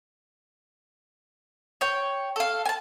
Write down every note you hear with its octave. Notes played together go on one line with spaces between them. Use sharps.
C#5 G5
A4 F5
G#5 A5